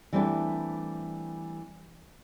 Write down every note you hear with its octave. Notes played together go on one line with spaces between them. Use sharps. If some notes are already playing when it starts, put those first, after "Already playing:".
E3 G3 A3 C4 D4 E4